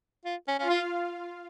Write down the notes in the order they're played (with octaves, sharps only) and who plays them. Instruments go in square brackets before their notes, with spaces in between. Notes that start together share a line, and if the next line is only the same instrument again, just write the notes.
[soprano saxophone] F4
C#4
[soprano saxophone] C#4 [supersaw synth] F4 F5
[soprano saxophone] F4